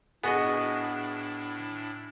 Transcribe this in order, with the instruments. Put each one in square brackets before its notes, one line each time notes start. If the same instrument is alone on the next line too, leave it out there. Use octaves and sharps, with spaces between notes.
[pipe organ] A2 D4 E4 [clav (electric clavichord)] B3 F#4 D#5 [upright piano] G#4